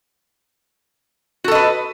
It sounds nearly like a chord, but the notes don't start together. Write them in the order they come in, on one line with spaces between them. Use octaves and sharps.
F#4 A4 D#5 B4